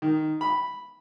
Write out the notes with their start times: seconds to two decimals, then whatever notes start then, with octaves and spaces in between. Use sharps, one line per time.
0.02 D#3
0.41 B5